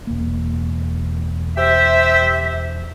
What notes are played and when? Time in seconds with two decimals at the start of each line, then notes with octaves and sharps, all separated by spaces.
0.07 E1 A#3
1.57 G4 C5 E5